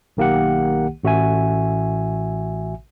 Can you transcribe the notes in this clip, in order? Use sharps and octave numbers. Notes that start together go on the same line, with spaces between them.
B1 D#3 A#3 G4 F#5
A1 F#4 E5 G#5